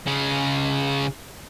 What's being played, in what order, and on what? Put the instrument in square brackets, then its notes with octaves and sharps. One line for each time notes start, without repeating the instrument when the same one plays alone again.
[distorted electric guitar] C#3 G#3